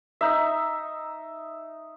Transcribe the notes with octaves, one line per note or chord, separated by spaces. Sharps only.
D#4 E5